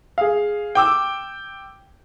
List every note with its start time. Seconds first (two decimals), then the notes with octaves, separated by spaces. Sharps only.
0.18 G#4 F5
0.75 G5 D6 E6